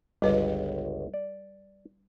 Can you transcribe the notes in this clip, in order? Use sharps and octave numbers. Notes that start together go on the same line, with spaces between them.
G1 C#2 G3 B4
D5